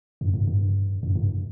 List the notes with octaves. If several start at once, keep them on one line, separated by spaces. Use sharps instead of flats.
F#2
G2
G2
F#2
G2